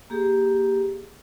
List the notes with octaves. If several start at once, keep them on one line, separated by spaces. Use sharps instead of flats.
A#3 G4 G#4